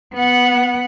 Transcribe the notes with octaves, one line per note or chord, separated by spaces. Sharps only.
B3 F#5